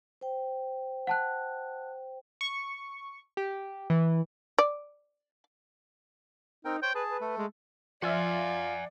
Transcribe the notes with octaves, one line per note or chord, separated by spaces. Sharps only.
C5 G5
F#5 A5 F#6
C#6
G4
E3
D5
C4 D#4 A#4 G5
C5 C#5 G5
G#4 B4 A5
B4
A3 A4
G#3
F3 F4 D5 E5 F#5 G#5